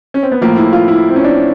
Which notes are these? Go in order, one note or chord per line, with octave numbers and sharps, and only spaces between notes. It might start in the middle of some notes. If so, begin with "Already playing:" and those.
C#4
C4
B3
A2 F3 A#3
E4
F4
E4
C4
C#4
D4